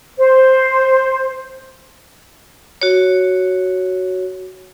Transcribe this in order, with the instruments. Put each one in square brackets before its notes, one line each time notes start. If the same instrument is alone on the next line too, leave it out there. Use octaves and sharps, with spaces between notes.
[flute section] C5
[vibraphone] F#4 C#5